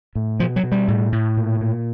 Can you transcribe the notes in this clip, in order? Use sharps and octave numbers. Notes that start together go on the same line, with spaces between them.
A2
B2 F3
F#3
B2
G3
A2
A2
A#2
A#2